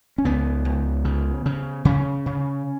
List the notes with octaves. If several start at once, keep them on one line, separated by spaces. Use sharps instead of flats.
C#4
C#2 B3
C#2
C#3
C#3
C#3 C#4
C#3